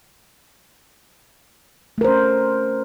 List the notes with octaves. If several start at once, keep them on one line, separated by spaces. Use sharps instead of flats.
A3 C#4 A#4 C5